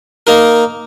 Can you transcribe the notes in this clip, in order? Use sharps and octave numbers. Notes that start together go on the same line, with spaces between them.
A#3 D#4 A#4